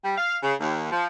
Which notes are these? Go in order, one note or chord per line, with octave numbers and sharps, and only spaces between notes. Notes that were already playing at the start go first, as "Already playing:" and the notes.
G3
F5
C#3
D#2
F3